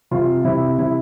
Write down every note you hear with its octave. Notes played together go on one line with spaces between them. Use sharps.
C3 F4
C3 E4
C3 E4